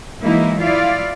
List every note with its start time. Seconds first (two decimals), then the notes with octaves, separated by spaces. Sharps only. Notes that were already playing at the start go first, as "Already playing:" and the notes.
0.21 E3 F#3 G#3 A#3 D#4 E4
0.60 E4 F4 D5 F5